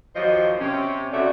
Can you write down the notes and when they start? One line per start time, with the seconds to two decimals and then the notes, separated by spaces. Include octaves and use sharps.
0.15 D#2 F3 F#3 C5 D#5
0.60 C3 C#4
1.12 C#3 A3 F#4 D5 E5